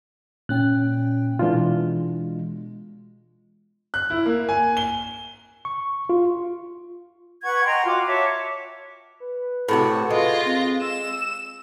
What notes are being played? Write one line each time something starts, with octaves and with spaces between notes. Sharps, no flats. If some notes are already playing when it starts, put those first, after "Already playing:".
A#2 C#4 G5 F#6
B2 E3 G#3 D4 F4
F#6
E4
A#3
G#5
G7
C#6
F4
B4 F#5 C#6 G#6
D#5 G5 A#5 C6
F4 F#4 D6
C#5 E5 A5 D6
B4
A2 C3 F#4
G#3 F4 A#6
C4
E6 E7